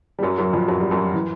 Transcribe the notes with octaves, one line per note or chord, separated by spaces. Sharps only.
G3
F#2 F#3
F#2 F#3
F2 F3
F#2 F#3
G3
F#2 F#3
E3